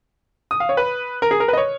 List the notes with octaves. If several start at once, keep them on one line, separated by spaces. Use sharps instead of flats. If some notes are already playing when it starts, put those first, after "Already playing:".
D#6
F5
C#5
B4
A#4
G#4
A#4
B4
D#5
C#5